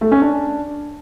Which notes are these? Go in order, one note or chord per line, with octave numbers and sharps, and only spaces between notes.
A3
C#4
D4